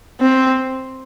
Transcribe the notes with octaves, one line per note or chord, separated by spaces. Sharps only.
C4